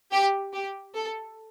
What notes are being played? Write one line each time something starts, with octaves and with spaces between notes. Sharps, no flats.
G4
G4
A4